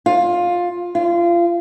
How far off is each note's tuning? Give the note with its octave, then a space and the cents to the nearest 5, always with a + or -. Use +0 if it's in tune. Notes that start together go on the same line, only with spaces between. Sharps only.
F4 +15
F4 -25